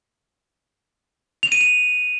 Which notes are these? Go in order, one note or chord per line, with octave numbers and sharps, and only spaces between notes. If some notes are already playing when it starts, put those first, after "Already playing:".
F7
D#7
F7